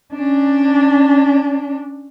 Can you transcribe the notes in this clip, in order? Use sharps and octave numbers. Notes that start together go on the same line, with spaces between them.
C#4 D4